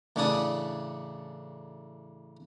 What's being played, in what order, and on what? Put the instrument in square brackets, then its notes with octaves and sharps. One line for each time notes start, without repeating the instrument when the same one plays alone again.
[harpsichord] A1 C#3 C#4 D4 A5 D#6